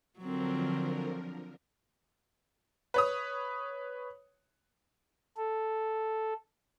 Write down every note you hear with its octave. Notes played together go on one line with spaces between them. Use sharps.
D3 F3 F#3 C4 A#4
B4 C#5 D#6
A4